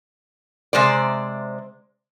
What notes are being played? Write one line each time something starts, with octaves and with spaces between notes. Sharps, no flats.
C3 G#3 C5 D5